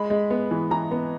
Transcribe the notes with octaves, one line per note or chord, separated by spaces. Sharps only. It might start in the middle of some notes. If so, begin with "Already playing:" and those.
Already playing: G#3 B5
G#3
B3
E3
E3 A#5
B3